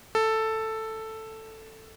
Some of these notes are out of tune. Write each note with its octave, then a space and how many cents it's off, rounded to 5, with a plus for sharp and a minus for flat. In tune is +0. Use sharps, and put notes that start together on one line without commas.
A4 +5